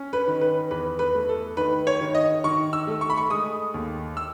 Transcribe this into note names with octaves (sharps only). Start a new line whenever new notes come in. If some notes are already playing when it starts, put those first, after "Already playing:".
Already playing: C#4
B4
D#3
B4
E2 B4
B4
A3
A4
D#3 B4
C#5
D#3
D#5
D#3 C#6
E6
A3
C#6
B5
C#6
G#3 D#6
D#2
E6